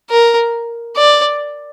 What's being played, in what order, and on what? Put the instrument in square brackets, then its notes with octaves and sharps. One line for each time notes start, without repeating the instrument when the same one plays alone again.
[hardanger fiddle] A#4
D5